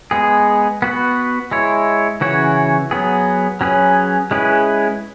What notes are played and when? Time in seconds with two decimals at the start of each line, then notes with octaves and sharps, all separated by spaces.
0.11 G#3 B3 G#4
0.82 B3 F#4 B4
1.51 G#3 E4 C#5
2.21 C#3 E3 C#4 F#4 C#5
2.91 F#3 B3 G#4
3.61 F#3 C#4 G#4 B4
4.31 G#3 C#4 E4 G#4 B4